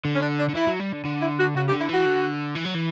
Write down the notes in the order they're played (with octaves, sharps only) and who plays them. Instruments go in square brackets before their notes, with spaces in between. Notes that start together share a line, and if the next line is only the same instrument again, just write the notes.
[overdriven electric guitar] D3
[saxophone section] C#4
D4
D4
[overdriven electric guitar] D3
[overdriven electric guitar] E3 [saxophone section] E4
[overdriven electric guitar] F#3
G3
D3
D3
[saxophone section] E4
F#4
[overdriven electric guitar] C#3 [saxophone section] F#4
[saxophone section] G4
[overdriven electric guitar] D3
[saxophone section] E4
[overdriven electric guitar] E3 [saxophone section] F#4
[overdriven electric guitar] D3
E3
F#3
E3